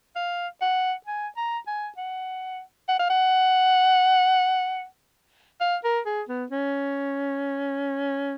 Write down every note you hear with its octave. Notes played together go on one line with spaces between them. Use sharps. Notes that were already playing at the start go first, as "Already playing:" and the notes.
F5
F#5
G#5
A#5
G#5
F#5
F#5
F5
F#5
F5
A#4
G#4
B3
C#4